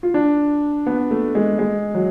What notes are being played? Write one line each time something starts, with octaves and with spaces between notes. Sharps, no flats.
F4
D4
B3
A3
G#3
G#3
F#3